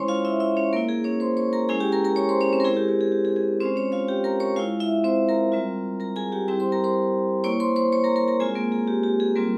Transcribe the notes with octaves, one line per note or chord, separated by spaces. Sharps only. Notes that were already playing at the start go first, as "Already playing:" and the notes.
Already playing: G#3 C#4 E4 C5 C#5 C6 C#6
F4 F5
E4 E5
E4 E5
C#4 C#5
A#3 E4 A#4
G#4
C#4 C#5
C5 C6
C#5 C#6
A#4 A#5
G#3 C#4 E4 G#4 G#5
G4 G5
A#4 A#5
A#4 A#5
C#5 C#6
C5 C6
C#4 C#5
C4 C5
A#4
G#3 E4 G#4
G4
G4
G#4
G4
G#4
G#4
G#3 C4 C#4 F4 C5
C#4 C#5
F4 F5
G4 G5
A#4 A#5
C#5 C#6
G#3 E4 F4 F5
E4 E5
C4 C5
A#4 A#5
G3 C4 F4
A#4 A#5
G#4 G#5
G4 G5
G3 C4 E4 G4 G5
C5 C6
A#4 A#5
C5 C6
A#3 E4 C#5 C#6
C5 C6
C5 C6
C#5 C#6
A#4 A#5
A#4 A#5
A#4 A#5
G#3 C4 F4 G#4 G#5
A#3 A#4
G#4
G4
G4
G#4
G3 A#3 C4 F4 A#4